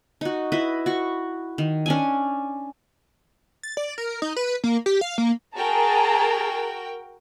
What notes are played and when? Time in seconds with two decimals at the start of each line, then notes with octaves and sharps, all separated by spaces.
0.21 D#4 F#4
0.52 E4 B4 D#5
0.86 F#4 C#6
1.58 D#3
1.86 C#4 D4 G#5
3.63 A6
3.77 D5
3.98 A#4
4.22 D#4
4.37 B4
4.64 A#3
4.86 G4
5.01 F5
5.18 A#3
5.54 F#4 G#4 A#4 G5 A5 A#5